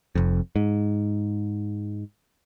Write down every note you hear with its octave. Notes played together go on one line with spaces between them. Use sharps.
F1 F2
G#2